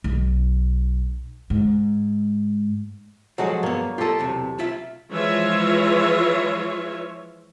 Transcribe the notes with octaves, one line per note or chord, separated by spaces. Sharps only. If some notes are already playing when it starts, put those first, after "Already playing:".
B1
G#2
F3 F#3 G#3 F#4 A4
G2 A#3 B3 C#5
F4 G4 A4 D#5
B1 E2 C3
B1 F4 E5
E3 F3 G#3 F4 C#5 E5